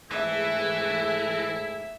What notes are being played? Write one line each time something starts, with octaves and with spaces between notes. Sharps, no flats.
G#2 E3 A3 E4 G#4 E5